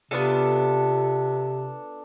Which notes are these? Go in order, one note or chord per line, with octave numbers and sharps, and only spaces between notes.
C3 B3 D4 F4 A4